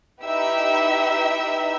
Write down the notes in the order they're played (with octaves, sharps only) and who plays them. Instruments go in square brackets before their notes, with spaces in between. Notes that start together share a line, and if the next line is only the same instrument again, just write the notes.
[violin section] D#4 E4 G4 B4 E5 E6